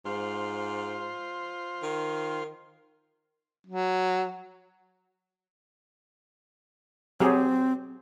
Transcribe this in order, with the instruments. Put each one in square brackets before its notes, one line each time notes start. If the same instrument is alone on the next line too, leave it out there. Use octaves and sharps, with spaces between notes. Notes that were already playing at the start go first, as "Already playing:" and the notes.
[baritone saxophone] G#2 [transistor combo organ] F4 C5
[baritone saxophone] D#3
F#3
[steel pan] F#3 G4 G#4 [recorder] C4